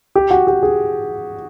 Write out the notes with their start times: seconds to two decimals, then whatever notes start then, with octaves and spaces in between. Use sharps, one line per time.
0.15 G4
0.31 F#4
0.47 G4
0.63 G#4